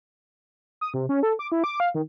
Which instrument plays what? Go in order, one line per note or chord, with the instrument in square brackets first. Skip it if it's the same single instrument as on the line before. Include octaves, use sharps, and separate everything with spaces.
[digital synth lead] D#6
C3
C#4
A4
D6
E4
D6
F5
D#3